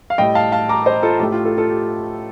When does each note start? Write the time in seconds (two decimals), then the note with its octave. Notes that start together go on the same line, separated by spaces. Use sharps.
0.10 F5
0.18 A2 G3 D#5 G5
0.35 F5 A5
0.52 F5 A5
0.69 A#5 D6
0.86 C5 D#5
1.03 F4 A4
1.20 A2 A3 G4
1.32 F4
1.45 F4 A4
1.58 F4 A4
1.70 G4